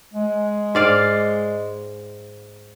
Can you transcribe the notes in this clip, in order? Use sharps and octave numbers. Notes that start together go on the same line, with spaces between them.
G#3
G#2 D5 F5